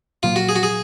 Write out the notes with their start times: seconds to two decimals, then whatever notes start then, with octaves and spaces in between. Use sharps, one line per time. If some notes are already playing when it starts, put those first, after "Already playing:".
0.23 A#2 F#3 A#3 F4
0.36 F#4
0.49 G#4
0.56 F#4
0.63 G#4